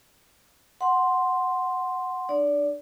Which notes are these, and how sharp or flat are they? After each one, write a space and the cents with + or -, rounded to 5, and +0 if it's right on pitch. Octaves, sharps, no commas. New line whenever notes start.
F#5 +0 C6 +0
D4 +35 D5 -25